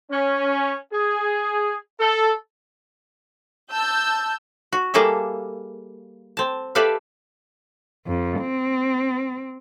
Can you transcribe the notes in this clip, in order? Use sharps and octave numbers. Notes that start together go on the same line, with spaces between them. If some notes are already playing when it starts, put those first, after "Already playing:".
C#4
G#4
A4
A5 E6 G6
F#4
G3 A#3 G#4 A4 D#5 E5
C4 A5
G4 A4 B4 D5 E5 F5
F2
C4